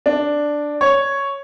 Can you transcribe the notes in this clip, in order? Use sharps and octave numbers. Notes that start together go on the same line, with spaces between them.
D4
C#5